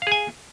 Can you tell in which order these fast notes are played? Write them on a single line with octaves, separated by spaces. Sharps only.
F5 G#4 G#5